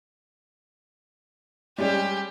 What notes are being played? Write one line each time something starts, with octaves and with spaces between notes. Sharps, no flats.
G3 G#3 C#4 G4